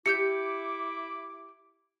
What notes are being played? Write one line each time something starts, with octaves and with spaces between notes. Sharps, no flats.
E4 G4 D6 E6 G6 C#7